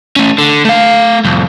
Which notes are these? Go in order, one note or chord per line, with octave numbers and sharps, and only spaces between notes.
A3 C#4
D3
A3 F5
C2 F2